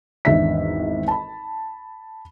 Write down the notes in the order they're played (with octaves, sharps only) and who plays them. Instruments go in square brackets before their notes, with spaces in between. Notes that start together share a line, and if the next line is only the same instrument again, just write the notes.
[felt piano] G#1 E2 D4 E5 B6
A5 B5